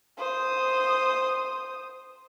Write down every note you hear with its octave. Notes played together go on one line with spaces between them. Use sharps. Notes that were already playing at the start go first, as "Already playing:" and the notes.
C5 D#6